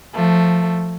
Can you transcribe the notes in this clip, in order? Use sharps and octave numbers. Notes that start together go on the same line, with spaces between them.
F3 A3